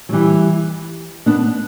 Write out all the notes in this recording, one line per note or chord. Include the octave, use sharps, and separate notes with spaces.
F#3
E3 G3
B3 D4